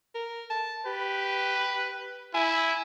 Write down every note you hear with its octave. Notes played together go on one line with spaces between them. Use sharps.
A#4
A5
G4 B4
E4 G#5